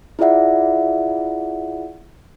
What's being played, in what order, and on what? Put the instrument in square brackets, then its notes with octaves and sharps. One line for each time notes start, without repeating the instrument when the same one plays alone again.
[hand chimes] E4 F4 G#4 D5 E5 F#5